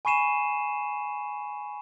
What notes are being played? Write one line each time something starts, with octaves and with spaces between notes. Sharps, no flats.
G#5 B5 C#6 C7 D#7 E7